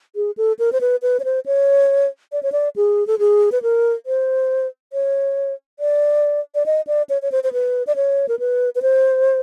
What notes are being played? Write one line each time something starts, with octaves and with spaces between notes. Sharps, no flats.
G#4
A4
A#4
C5
B4
B4
C#5
C5
C#5
D5
C#5
D5
G#4
A4
G#4
B4
A#4
C5
C#5
D5
D5
D#5
D5
C#5
C#5
C5
C5
B4
D5
C#5
A#4
B4
B4
C5